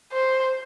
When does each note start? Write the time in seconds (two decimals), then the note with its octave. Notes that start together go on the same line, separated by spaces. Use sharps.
0.13 C5